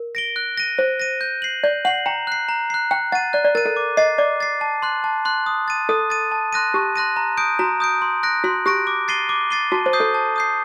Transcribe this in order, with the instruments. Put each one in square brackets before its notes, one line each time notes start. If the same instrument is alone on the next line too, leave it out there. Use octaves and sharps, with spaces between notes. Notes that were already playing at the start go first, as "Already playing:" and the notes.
Already playing: [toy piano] A#4
[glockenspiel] A#6 D7 G7
F#6
A#6 D#7
[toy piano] C5 [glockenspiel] F#6
[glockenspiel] A#6 D#7
G6
C7 F#7
[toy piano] D5 [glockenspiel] G6
[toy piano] F#5 [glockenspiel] C7 F#7
[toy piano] G5 [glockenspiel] A#5
[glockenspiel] F#6 C7
A#5
F#6 C7
[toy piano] G5 [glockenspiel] F#6
[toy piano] F#5 [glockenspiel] A6 D#7
[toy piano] D5 [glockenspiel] F#6
[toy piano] D5
[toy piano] A#4 [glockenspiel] A6 D#7
[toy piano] A4
[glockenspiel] D6
[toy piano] D#5 [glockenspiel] A6 C7
[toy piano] D5 [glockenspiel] D6
[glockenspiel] A6 C7
A5
C6 F#6
A5
C6 F#6
D#6
A6 D#7
[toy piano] A4 [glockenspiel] D#6
[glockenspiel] A6 D#7
A5
C6 F#6 A#6 D#7
[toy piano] G4 [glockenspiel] A5
[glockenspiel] C6 F#6 A#6 D#7
A#5
D#6 G6 D7
[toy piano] F#4 [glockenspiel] A#5
[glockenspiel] D#6 G6 D7
C6
F#6 A#6 D7
[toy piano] F#4 [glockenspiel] C6
[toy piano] G4 [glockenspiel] F#6 A#6 D7
[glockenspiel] D6
A6 C7 D#7 G7
D6
A6 C7 D#7 G7
[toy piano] F#4 [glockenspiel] A5
[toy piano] C5
[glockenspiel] D#6 G6 C7
[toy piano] A4
[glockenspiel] A5
D#6 G6 C7